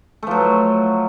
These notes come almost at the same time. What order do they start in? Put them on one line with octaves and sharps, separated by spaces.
A3 F3 F#3